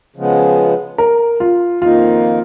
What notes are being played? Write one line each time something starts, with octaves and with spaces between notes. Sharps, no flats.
C#3 F3 G#3 B3
A#4
F4
F2 D#3 A#3 D#4 F4